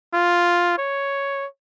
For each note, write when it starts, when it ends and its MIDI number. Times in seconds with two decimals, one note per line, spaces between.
0.14 0.76 65
0.78 1.46 73